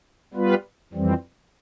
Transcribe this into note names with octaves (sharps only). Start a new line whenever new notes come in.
G3 B3 F4 B4
F2 E3 G3 C4